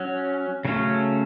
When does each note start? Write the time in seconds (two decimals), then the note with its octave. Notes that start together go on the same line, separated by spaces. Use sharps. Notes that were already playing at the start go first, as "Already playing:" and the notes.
Already playing: F#3 C#4
0.65 C#3 F#3 A3 C#4